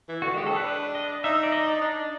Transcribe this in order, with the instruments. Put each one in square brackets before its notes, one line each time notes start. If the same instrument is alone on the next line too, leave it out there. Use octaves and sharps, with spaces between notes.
[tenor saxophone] E3
[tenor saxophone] D3 [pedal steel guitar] F#4
[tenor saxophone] G#3 [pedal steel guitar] G4
[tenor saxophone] D4 [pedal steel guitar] A4
[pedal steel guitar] B4
B4
D#5
[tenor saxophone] D#4 [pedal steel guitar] E5
[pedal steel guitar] D5
D#5
D5
[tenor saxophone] D4